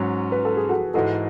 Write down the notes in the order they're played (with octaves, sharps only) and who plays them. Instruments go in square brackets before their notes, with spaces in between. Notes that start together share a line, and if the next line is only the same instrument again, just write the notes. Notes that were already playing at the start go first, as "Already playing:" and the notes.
Already playing: [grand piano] G#2 F#3 C#4
[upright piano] B4
A4
G#4
F#4 A4
[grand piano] G#2 E3 G#3 [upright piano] F#4 A4